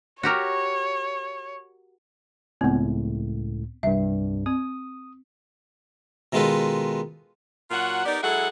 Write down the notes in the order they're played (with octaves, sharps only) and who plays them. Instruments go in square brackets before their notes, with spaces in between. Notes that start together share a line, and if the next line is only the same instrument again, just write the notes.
[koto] F#4 G4 A#4 [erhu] C#5
[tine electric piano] C#2 A2 [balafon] B3 C4
[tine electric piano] C2 G2 [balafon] E5
[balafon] C4 [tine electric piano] D#6
[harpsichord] B2 D#3 G#3 F4 A4 B4
[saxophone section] A#2 F#3 F4 F#4 F#5
B3 D#4 G4 A#4 D5
F#3 G#3 E4 G#4 A4 F#5